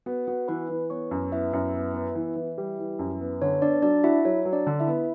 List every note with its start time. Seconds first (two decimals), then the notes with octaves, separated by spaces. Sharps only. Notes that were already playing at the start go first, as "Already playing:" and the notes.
0.06 B3 F#4 F#5
0.27 B3 F#4 F#5
0.48 E3 B4 B5
0.69 E3
0.90 B3 C#5 C#6
1.11 F#2
1.32 B3 E4 E5
1.53 F#2
1.74 B3
1.94 B3
2.15 E3
2.36 E3
2.58 G3
2.79 E3
2.99 F#2
3.21 B3
3.42 D3 C#5
3.62 B3 D4 D5
3.82 F#3 D4 D5
4.04 E4 F#4 E5
4.25 F#3 C#5
4.45 F#3
4.53 D4 D5
4.67 D3
4.80 E4 E5
4.87 B3